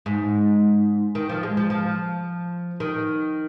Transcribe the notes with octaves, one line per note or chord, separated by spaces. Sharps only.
G#2
D#3
F3
G#3
F3
F3
D#3